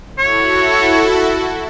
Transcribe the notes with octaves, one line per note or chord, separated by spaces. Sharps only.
E4 F#4 A4 C#5